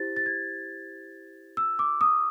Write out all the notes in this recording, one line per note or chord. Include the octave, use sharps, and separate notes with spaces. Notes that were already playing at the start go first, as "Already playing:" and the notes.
Already playing: E4 G4 C5 A6
A6
G#6
E6
D6
D#6